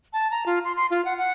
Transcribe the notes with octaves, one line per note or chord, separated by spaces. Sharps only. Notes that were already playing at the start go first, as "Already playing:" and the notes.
A5
A#5
F4
C6
C6
F4
F#5
F#5